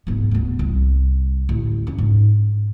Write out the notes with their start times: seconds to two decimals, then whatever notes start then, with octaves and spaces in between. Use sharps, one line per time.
0.07 G#2 B3
0.31 D1 B3
0.59 C2
1.49 A1 D2
1.87 C#4
1.98 G#2